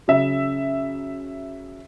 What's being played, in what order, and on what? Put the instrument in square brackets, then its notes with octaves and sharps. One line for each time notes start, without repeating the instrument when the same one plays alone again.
[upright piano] C#3 F#3 E5